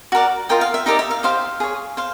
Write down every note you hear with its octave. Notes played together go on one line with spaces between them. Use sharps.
F#4 A#4 D5
F4 A#4 D#5 G5
F5
E5
D#4 G4 A#4 D5 D#5
E5
F5
G4 C5 D#5 F5
G#4 C#5
C5 F5